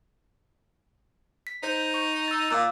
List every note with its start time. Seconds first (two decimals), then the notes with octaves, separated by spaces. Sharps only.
1.47 B6
1.63 D#4 C5 G6
1.94 C#6
2.28 E6 A6
2.51 A#2 F5 D6 E6